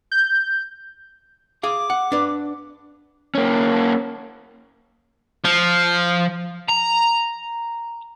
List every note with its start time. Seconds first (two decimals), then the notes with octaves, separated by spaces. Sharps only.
0.12 G6
1.63 G#4 F5 D6
1.90 F#5
2.12 D4 B4
3.35 A#3 C#4
5.44 F3
6.68 A#5